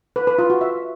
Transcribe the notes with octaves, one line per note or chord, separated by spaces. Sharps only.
B4
B4
F4
F#4
E5